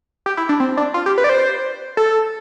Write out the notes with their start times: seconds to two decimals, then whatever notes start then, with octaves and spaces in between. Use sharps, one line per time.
0.26 G4
0.37 E4
0.49 D4
0.60 C4
0.77 D4
0.94 F4
1.06 G4
1.18 B4
1.24 D5
1.29 C5
1.97 A4